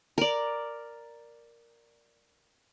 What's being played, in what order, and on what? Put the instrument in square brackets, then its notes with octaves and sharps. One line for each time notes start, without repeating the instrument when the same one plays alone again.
[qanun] A#4 D5